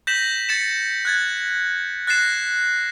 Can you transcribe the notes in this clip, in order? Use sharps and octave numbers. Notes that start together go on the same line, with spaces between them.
G6 A#6 B6 E7 F#7
A6 C#7 E7
F#6 G#6 A6
F#6 A6 A#6 C7 E7